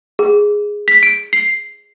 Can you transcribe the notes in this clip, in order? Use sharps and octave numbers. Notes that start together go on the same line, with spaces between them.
G#4
B6
D7
C7